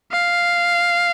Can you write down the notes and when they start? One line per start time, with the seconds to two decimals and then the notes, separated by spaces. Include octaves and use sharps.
0.12 F5